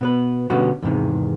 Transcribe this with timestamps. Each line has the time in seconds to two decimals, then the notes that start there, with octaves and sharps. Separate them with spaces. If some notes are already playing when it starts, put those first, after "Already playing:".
0.01 B2 B3 B4
0.50 B2 D3 G3 B3 C#4 F#4
0.82 E2 G#2 C3 D#3